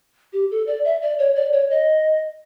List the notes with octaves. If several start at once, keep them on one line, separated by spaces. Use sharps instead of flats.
G4
A4
D5
E5
D5
C#5
D5
C#5
D#5